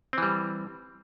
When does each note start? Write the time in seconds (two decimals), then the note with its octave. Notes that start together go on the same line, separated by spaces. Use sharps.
0.13 C4
0.18 E3
0.22 G3